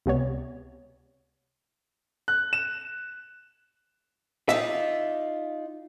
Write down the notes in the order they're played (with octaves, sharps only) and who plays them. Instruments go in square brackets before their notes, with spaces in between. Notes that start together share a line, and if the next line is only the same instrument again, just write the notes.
[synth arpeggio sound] C#2 C3 B3 C#5
[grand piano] F#6
E7
[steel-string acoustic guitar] D#4 F4 D5 [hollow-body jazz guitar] E5